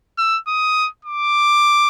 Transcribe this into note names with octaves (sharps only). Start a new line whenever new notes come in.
E6
D#6
D6